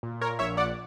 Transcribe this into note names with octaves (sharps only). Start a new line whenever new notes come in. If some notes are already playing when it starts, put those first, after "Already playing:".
A#2
A#4 C#5
A#1 C#5 E5
D5 F#5